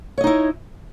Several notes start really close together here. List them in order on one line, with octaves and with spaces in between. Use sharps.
C#5 D#5 D#4 E4